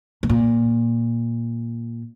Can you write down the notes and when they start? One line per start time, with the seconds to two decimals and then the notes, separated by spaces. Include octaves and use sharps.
0.23 A2
0.29 A#2